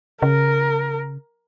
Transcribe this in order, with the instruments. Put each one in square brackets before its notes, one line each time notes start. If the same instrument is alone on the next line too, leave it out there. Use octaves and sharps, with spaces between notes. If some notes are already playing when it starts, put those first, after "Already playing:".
[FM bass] C#3 [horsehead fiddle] A#4